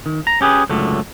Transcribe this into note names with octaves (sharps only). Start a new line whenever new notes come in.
D#3
A#5
C#4 G4 G#4 B4
C#2 F#2 A2 D3 A3